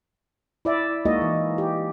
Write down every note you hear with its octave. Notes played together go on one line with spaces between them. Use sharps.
E4 D5 E5
G#3 A#3 D#4 F#4 D#5
E3
G4